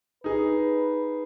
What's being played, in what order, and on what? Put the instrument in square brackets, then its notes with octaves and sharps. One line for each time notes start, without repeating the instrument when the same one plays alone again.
[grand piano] D#4 G#4 [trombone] B4